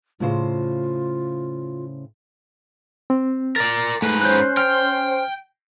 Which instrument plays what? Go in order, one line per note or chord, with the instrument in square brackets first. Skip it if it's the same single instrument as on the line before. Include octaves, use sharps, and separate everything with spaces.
[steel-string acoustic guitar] A2 C#3 C5 [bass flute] F4
[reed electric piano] C4
[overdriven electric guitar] A#4 D5 [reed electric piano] A6
[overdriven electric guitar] G#2 B4 [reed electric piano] A3
[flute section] C#4 C5 [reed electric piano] F#6 G6
[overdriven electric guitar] G5 [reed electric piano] F6